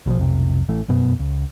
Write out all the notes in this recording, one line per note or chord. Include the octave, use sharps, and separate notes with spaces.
A#1 B2 E3 F3
B1 F2 C3
A1 E3 A3
F1 F#2 B2 B3
C#2